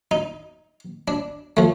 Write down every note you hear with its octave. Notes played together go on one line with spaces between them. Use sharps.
D#4
D4
F3 A3